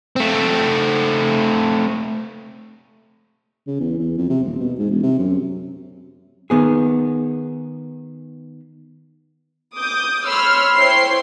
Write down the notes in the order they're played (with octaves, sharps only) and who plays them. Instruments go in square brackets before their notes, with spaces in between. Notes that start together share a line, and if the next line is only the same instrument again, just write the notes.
[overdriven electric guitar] A3 C4
[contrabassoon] C#3
E2
E2
F2
C3
D#1
B2
G#2
E1
C3
F#2
[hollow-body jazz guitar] D#3 B3 G#4
[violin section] D6 D#6 G6
C#5 B5 C6 E6 F6
E4 C5 C#5 G5 C6 C7